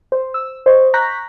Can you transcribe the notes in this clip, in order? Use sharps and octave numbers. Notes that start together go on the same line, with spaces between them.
C5
E6
C5 D#5 C#6
A#5 C#6 F#6 G6 A#6 B6